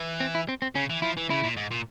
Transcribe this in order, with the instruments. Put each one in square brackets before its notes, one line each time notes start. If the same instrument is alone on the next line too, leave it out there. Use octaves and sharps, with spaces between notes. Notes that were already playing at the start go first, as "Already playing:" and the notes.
Already playing: [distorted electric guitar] E3
[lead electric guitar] C4
E4
C4
C4
[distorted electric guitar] C#3 [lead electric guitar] C#4
[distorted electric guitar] E3
[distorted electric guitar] F3 [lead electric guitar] E4
[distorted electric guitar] E3
[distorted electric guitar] C#3 [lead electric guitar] E4
[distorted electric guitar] A#2
G#2
A#2